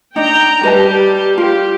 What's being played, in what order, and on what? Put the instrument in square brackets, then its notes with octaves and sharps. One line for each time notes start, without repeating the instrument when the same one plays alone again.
[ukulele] D4 D#4 [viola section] G5 A#5
[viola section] G3 G4 [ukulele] B4 D#5 A5
[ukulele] F4 [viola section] G4